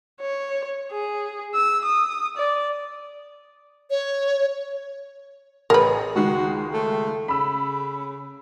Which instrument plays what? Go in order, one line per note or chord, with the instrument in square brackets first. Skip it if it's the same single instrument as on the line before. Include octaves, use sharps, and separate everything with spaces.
[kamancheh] C#5
G#4
E6
D#6
D5
[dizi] C#5
[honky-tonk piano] A1 G#4 [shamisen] A#4 B4
[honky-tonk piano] C#2 D#3 G#3 [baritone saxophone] F#4
[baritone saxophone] A3
[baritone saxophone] C#3 [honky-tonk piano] B5 E6